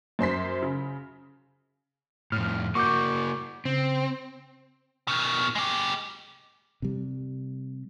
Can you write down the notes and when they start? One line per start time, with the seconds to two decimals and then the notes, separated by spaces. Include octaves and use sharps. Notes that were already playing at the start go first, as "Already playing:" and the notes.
0.19 F#2 C5 C6 B6
0.62 C#3
2.32 F2 A2 F6
2.75 A#3 F#4 C#6 D6 G6
3.65 C#3 C4
5.08 B2 D#3
5.55 G#3 G4
6.82 C3 G3